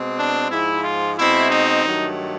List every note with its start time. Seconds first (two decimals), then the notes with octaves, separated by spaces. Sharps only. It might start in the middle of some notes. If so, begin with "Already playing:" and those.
Already playing: B2 G#3 C4
0.18 D4
0.51 G#2 F3 G#3 E4
0.84 F4
1.18 B2 G#3 C4 E4
1.51 D#4
1.85 G2 D#3 F#3 A3